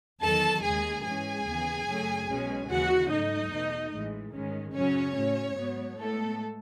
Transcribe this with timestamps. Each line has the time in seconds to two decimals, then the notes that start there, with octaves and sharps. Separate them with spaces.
0.21 E2 D#3 F#3 A4 A5
0.63 D#2 C#3 G#3 G#4 G#5
1.04 G#2 E3 G#3 C#4 G#4 G#5
1.46 D#2 C#3 E3 B3
1.87 F#2 C#3 F#3 A3 C#4
2.27 B1 B2 G#3 C#4
2.68 D#2 C#3 E3 G#3 F#4 F#5
3.10 G#2 F#3 A3 D#4 D#5
3.51 E2 B2 A3
3.92 A1 A2 E3 G#3
4.33 A1 G#2 D#3 G#3 C#4
4.74 F#2 C#3 F#3 C#4 C#5
5.15 A2 F#3 C#4
5.56 G#2 F#3 B3
5.97 A2 G#3 A3 B3 A4